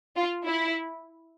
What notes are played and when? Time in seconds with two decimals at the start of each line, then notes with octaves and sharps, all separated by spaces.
0.16 F4
0.45 E4